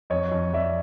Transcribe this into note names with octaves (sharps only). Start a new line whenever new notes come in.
F2 C#5 D#5
F2
F2 D5 E5